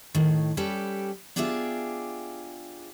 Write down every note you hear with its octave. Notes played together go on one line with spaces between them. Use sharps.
A2 D#3
G3 C#4 G4 A4 B4 D5
B3 D4 F4 G4 G#4 E5